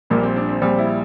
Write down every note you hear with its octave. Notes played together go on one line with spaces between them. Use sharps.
A#1 A#2 G3 A#3
C4
D4
C4
A#1 A#2 G3 C4
E4